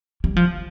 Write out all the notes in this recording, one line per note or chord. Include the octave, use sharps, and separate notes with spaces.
G3
F3